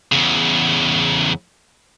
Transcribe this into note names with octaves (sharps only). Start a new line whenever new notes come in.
E2 C#3